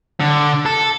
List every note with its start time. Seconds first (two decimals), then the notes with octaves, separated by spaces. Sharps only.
0.20 D3
0.66 A4